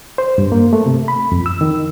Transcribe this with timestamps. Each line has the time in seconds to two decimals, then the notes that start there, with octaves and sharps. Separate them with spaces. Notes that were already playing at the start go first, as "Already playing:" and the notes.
0.18 C5
0.38 G2
0.52 A#3
0.73 A3
0.86 C3
1.08 B5
1.32 F2
1.46 E6
1.61 D#3